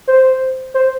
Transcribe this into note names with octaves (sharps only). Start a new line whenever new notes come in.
C5
C5